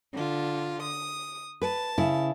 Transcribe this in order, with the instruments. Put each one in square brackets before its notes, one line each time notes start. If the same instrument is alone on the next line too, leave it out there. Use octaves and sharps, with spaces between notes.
[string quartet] D3 F4
D#6
[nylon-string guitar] B4 [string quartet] A5
[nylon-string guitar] C#3 E4